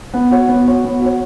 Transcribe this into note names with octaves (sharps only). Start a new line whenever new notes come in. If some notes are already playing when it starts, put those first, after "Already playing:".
B3
F#4 C#5
B3
F#4 C#5
B3
F#4 C#5